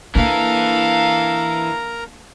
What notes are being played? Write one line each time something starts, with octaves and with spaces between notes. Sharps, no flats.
E3 A#3 D4 A4 A#4 F5 A#5